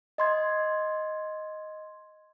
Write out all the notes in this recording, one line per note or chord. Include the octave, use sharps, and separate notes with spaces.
D#5 C6 G#6